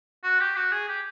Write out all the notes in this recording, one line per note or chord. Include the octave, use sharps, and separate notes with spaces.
F#4
G4
F#4
G#4
G4